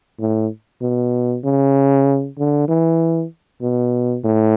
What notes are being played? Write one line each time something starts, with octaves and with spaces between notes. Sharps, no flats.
A2
B2
C#3
D3
E3
B2
A2